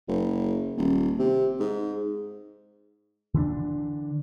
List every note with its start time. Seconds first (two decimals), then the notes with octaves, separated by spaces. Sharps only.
0.08 F#1
0.77 D#1
1.19 C3
1.60 G#2
3.34 D3 E3 C4 D4